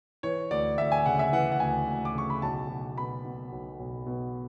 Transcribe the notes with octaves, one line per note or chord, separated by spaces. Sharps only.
E3 C#5
D2 D5
D2 E5
G#5
C#3 F#5
E5
E3 F#5
F#5
D2 G#5
D2
D6
C#3 C#6
B5
B1 A5
B1
B2 B5
B2
B1
B1
B2